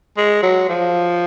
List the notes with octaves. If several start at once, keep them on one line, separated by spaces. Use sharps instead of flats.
G#3
F#3
F3